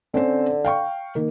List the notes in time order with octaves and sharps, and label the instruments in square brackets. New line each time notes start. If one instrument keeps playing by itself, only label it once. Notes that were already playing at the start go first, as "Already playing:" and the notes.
[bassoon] D3 [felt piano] C4 C#4 C5
[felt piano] F5 G5 C#6
D#3 A#3